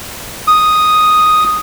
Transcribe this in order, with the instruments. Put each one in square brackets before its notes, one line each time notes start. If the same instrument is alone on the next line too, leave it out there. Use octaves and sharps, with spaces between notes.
[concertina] D#6